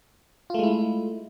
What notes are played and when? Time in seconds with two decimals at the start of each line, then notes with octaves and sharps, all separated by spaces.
0.50 F4
0.54 A3
0.59 G#3
0.63 E4